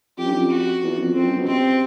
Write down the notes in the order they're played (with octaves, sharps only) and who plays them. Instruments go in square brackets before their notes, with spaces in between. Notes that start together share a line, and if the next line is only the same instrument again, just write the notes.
[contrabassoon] F2 [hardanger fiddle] G4
[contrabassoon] F#2
F2
[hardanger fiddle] F#4
[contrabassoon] E2
F2
[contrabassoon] F2 [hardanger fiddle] C4
[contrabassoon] F#2
B2
[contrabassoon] C3 [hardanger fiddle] C4